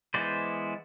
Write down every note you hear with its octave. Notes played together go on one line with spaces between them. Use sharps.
E3 G#3 B3 C5 D5